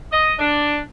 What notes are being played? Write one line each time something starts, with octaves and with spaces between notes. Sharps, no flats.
D#5
D4